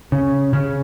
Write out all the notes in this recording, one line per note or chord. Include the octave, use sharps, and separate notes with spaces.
C#3
C#3